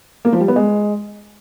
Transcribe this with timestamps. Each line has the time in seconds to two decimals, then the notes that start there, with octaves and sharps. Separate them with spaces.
0.25 A#3
0.33 F3
0.40 G3
0.48 B3
0.56 G#3